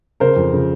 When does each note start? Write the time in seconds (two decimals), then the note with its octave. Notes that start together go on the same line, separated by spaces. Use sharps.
0.20 C#3 A#4 C5
0.37 F2
0.53 C#3